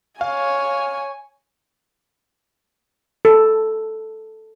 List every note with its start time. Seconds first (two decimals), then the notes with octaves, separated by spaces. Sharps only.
0.21 C#5 F5 G#5
3.25 A4